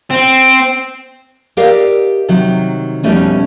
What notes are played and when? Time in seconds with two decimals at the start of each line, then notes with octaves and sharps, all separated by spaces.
0.11 C4
1.57 G4 A#4 D5 D#5 F5
2.28 C3 D#3 F#3
3.03 F2 B2 G3 A3 C#4 D#4